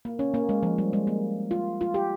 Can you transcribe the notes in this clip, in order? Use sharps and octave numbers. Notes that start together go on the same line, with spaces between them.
A#3
C#4
A#3
G#3
F3
G3
G#3
A#3
F4
F4
G4